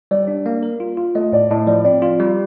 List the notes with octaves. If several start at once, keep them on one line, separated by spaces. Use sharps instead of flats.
G3 D5
D4
A#3
A#4
F4
F4
A3 D#5
A2 D5
A2 D#5
F3 D5
C4 D5
F4
G3